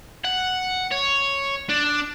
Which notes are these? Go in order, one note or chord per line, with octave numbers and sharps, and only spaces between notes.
F#5
C#5
D4